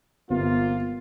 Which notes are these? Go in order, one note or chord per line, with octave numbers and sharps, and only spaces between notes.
G1 C3 A#3 F4